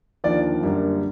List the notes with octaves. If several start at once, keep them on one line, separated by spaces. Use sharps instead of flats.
D#2 D3 F3 D5
F#2 D3 G3 A#3